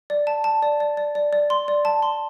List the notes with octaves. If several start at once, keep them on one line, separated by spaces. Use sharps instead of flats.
D5
A5
A5
D5
D5
D5
D5
D5
C6
D5
A5
C6